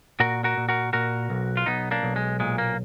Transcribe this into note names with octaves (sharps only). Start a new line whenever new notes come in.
A#2 F#4 A#4
F#4 A#4
A#2
F#4 A#4
A#2 F#4 A#4
B1
F4
B1 B3 D#4
A#3 D4
B1
G#3
A#2 G#3
A#3